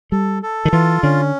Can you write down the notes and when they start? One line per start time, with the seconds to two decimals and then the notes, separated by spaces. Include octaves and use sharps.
0.12 G3 A4
0.43 A4
0.65 D#3
0.72 E3 F4
1.03 D3 C#4